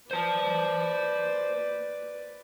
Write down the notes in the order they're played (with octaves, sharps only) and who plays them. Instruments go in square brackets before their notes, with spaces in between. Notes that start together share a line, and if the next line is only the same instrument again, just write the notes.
[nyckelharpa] B4 D5 [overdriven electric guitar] C5 A5